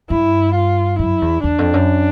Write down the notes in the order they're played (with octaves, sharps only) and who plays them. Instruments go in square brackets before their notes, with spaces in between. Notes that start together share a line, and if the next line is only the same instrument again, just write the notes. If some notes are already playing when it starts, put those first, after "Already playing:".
[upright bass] G2 [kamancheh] E4
[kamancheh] F4
[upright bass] F#2 [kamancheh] E4
[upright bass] E2
[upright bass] E2 [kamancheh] D4
[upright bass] F2
F#2